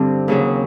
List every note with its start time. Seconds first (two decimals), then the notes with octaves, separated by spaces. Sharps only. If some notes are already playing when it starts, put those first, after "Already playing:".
Already playing: G2 D3 G3 C4
0.28 D#2 C#3 F#3